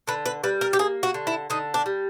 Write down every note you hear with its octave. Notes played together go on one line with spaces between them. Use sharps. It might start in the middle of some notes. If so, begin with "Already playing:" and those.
D3 B4
B4
G3 B4
A#4
G4
A#3 G#4
F#4
D3
E4
D3 D#4
D4
G3